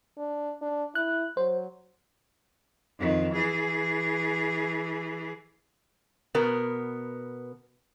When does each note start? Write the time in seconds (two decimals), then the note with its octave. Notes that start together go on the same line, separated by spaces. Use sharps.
0.18 D4
0.62 D4
0.95 E4 F#6
1.37 F#3 C5
2.99 F2 D#3
3.33 E3 G#4
6.35 B2 B3 A#4